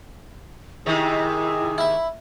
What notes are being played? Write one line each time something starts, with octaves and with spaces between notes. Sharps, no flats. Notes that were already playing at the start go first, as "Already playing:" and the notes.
C3 D#3 E4 G#4
E4 E5 B5